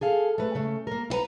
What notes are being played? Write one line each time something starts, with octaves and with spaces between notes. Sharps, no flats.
G#4 A4 F5
A3 B4
C#3 A3
A#3 A#4
E4 B4 A#5